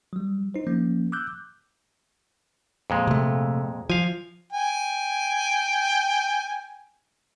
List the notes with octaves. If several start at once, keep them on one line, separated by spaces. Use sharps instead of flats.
F#3 G3
D#4 C5
F3 A#3 C#4
D6 E6 F#6 G6
F2 A#2 G#3
C3 A3
F3 F5 G#5
G5 G#5